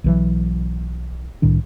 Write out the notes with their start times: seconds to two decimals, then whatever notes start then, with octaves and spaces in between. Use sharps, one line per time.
0.04 B1 E3 F#3
1.42 C2 A2 D#3 D4